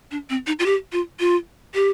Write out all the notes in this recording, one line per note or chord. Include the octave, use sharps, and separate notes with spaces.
D4
C4
D#4
F4
G4
F4
F4
G4